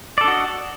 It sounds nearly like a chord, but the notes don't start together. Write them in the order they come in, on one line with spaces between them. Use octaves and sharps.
D5 A4 D4 F#4 D#5